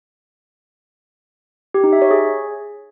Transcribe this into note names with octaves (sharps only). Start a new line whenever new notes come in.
G4
D#4
E5
C#5
G#4